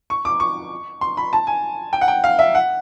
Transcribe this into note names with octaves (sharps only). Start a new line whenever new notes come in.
C#6
D6
C#6
C6
B5
A5
G#5
G5
F#5
G5
F5
E5
F#5